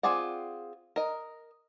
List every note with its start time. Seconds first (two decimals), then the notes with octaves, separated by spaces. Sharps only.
0.03 C4 F4 G#4 D5 F#5
0.96 A#4 D#5